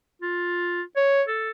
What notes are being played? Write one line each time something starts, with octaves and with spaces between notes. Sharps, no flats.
F4
C#5
A4